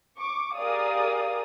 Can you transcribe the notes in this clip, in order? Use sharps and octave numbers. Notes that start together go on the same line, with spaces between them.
C#6 D6
G4 G#4 A#4 D5 F5 D#6